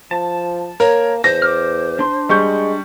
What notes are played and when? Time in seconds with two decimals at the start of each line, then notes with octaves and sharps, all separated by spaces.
0.11 F3 A5
0.80 A#3 A#4 C#5
1.24 E2 C5 A#6
1.42 D6 F6
1.99 D4 C6
2.29 G3 G#3 C#6 G6